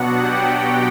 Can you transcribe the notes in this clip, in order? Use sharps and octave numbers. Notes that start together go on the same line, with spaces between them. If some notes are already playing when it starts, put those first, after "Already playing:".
Already playing: B2 F#3 B3 D4 F#4 F#5
G4 G5